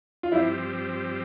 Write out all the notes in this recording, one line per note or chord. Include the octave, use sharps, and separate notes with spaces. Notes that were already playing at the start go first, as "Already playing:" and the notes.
F4
G2 F3 C4 E4 G4